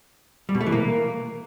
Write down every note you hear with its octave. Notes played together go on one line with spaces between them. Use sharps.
G3
B2
A3
E3
A#3